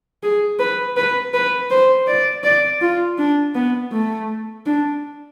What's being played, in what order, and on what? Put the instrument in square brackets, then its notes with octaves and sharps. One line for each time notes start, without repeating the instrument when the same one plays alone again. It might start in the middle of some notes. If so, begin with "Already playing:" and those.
[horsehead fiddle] G#4
B4
B4
B4
C5
D5
D5
F4
D4
B3
A3
D4